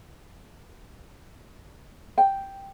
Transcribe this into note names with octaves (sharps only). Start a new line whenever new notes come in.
G5